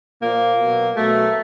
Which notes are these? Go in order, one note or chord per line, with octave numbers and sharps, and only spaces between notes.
A#2 F3 A#3
B2 F#3
B2 F#3 A3